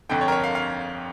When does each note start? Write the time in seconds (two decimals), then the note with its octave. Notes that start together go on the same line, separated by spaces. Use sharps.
0.09 G1 F2 D3 G5
0.21 C#5
0.28 A#4
0.32 C#5
0.44 F5
0.55 F5